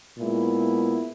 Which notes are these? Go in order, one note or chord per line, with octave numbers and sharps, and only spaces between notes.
A#2 G#3 B3 E4